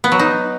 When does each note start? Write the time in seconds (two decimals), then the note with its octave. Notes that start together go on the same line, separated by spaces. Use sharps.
0.04 B3
0.12 F#3
0.19 D#4